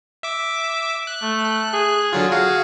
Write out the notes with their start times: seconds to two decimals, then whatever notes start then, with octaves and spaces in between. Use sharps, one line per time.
0.23 E5 D6
1.07 F#6
1.22 A3
1.74 G#4
2.13 D3 F#3 F4
2.32 F#4 G#4 F5